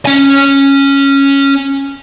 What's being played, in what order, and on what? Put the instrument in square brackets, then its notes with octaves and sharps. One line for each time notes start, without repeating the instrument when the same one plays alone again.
[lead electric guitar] C#4 G#5